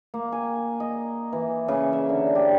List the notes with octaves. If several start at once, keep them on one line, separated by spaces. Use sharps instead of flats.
A#3
G#5
D#5
E3
C#3
E5
D3
G4